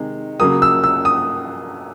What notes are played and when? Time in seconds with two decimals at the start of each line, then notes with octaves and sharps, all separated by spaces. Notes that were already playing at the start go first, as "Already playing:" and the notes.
Already playing: C3 D#3 G#3
0.40 C#3 F#3 A#3 D#6
0.62 E6
0.84 E6
1.05 D#6